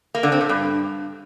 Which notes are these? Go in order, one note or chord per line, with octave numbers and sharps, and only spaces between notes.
A#3
D3
C4
A#2
G2